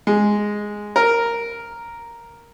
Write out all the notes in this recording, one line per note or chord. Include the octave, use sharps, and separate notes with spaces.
G#3
A#4